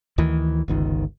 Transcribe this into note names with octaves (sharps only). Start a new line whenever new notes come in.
D2 D#3 E3
G1 C#2 D#3